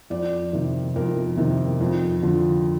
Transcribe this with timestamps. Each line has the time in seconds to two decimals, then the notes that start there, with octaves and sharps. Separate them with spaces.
0.10 F2 D5
0.53 C3 D#3
0.96 F2 A#4
1.37 C3 D#3
1.81 F2
2.22 D3 F3